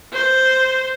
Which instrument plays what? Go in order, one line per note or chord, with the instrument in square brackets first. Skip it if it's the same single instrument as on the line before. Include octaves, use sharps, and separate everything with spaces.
[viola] C5